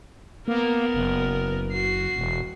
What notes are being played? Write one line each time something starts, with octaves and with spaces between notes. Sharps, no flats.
A#3 B3 A#4
F#1
F#4 C7
E1